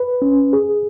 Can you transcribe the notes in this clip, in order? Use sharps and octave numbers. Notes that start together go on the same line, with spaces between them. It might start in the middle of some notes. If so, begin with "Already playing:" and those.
Already playing: B4
C#4
G#4